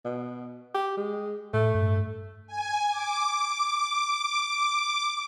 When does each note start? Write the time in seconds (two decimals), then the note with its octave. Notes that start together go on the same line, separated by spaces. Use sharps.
0.05 B2
0.74 G4
0.97 G#3
1.53 A2 A3
1.75 G2
2.47 G#5
2.89 D6